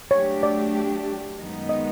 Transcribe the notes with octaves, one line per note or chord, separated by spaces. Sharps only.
F#3 A3 D4 G4 C#5
D5
F#2 D#3 G#3 B3 D#4
D#5